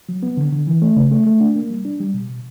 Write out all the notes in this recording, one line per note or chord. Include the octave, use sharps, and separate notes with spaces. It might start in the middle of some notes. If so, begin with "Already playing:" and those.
F#3
B3
D3
D3
E3
A3
C#3
A3
A3
D4
A#3
G3
D4
G3
B2
B2